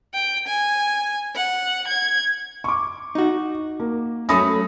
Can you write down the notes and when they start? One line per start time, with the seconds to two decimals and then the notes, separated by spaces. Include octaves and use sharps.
0.14 G5
0.47 G#5
1.35 F#5
1.87 G#6
2.64 C#6 D6
3.15 D#4 F#4
3.80 A#3
4.29 F#3 A3 C#4 B5 D#6 A#6